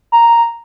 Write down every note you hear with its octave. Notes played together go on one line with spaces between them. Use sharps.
A#5